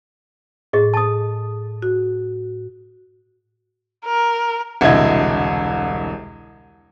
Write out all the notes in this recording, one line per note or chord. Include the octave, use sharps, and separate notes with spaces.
A2 G#4 D#5
A5 D#6 A6
F#4
A#4
E1 C2 D3 E4 D#5 G#6